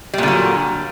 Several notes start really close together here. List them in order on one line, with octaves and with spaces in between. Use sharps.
G3 A#2 D3 F#3